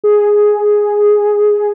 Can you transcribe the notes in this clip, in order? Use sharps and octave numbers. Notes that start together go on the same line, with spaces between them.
G#4